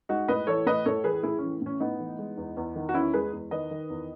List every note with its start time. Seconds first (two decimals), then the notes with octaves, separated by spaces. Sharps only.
0.09 G#3 D#4 F#4
0.28 A2 B4 D#5
0.47 E3 A4 C#5
0.66 A2 B4 D#5
0.85 A2 A4 C#5
1.04 E3 G#4 B4
1.23 A2 E4 G#4
1.38 E3 C#4
1.61 A2 C#4
1.80 A2 B3 D#4
2.00 E3
2.19 G#3
2.38 E2
2.57 E2
2.75 D#3
2.89 F#4
2.94 E2 C#4 E4
3.13 G#3 G#4 B4
3.33 E2
3.51 D#3 B4 D#5
3.71 D#3
3.90 E2